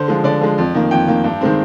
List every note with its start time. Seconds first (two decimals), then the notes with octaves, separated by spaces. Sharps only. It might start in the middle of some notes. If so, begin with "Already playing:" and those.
Already playing: D3 C5
0.08 F3 G#3
0.24 D3 D5
0.41 F3 G#3
0.58 F2
0.74 D#3 A#3
0.91 F2 G5
1.08 D#3 A#3
1.24 G2
1.41 D#3 G#3 C4